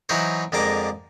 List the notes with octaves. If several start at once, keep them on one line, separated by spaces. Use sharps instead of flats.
E3 F#3 D#4 E4 C5 C#5
F2 D3 G#3 A#3 A#5 D6